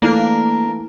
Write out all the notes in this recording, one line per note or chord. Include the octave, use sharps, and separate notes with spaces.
E3 A3 A#3 D4 A#4